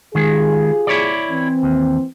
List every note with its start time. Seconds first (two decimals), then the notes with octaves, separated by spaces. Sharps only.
0.15 D#3 G#3 F4 G4 G#4
0.87 E4 C#5 D5
1.31 E3 C4
1.63 D#2